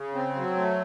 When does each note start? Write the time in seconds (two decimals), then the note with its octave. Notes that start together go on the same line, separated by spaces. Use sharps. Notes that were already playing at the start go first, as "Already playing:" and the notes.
Already playing: C#3
0.15 C4
0.36 F#3
0.56 A3